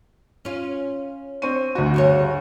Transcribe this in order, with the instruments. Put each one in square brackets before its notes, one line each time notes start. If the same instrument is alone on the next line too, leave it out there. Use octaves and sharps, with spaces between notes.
[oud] C#4 F4
[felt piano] C4 C#6 D#7
D2 F#4
[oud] G2 C#3 C#5